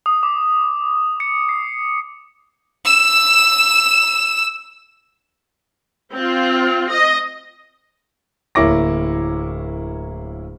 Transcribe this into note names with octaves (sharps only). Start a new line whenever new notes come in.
D#6
D6
C#7
C7
E6 E7
C4 F4
D#5
D1 A#3 E4 C#5 D6 A#6